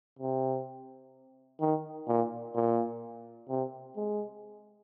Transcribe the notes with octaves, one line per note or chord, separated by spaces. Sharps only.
C3
D#3
A#2
A#2
C3
G#3